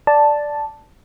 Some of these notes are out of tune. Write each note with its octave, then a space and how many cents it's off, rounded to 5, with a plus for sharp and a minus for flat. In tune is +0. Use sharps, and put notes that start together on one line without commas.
D5 +0 A5 +0